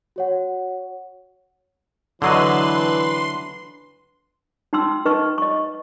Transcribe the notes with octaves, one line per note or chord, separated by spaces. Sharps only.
F#4 C#5 F#5
D3 E3 F#3 D4 B4 D#5 C6
D#4 G5 C6 E6
D#4 B4 D#5 C#6
D#5 C#6